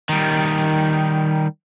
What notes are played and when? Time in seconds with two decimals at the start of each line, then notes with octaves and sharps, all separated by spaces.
0.09 D#3 G3